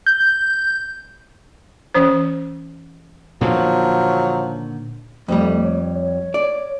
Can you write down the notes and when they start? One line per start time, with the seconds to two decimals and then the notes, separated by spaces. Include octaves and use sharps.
0.06 G6
1.94 E3 C#4 C5
3.41 A#2 D3 D#3 F3 F#3
5.28 F2 G3 A3
5.62 C#5
6.00 C#5
6.34 D5